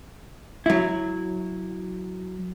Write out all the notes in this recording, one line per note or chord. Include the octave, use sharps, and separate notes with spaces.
F#3 E4